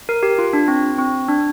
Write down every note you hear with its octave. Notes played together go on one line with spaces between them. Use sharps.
A#4
G4
F4
D4
C4
C4
D4